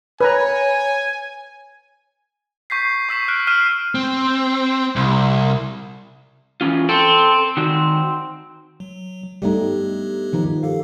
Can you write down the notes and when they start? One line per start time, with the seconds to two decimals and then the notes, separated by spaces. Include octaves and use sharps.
0.21 B4 C#5 G#5 A#5
2.70 C#6 G6 B6 C7
3.09 C#6 E6 B6 E7
3.28 F6 F#6 D7
3.47 E6 F6 C7 D#7 E7
3.95 C4
4.96 C2
6.61 E3 C#4 F4
6.89 C4 A4
7.57 D#3 F#4
8.80 F#3
9.42 G2 G3 A3 B3 D#4 G4
10.33 D#3 F3 D#4
10.63 G4 A4 F5